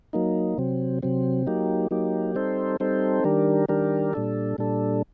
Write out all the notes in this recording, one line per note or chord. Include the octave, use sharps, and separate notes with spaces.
F#3 A#3 D#4
C3 F#3 C4
C3 F#3 C4
F#3 A#3 D#4 G4
F#3 A#3 D#4 G4
G3 C4 D#4 A4 C5
G3 C4 D#4 A4 C5
D#3 G3 D4 G4 A#4
D#3 G3 D4 G4 A#4
A#2 G3 D4 A4
A#2 G3 D4 A4